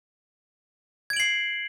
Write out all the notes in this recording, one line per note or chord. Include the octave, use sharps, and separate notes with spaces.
G#6 C7 D7 F#7